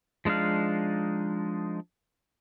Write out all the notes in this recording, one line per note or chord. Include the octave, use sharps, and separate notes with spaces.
F3 G#3 D4 D#4 F5